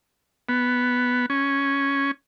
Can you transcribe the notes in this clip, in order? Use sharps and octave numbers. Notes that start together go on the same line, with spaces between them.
B3
C#4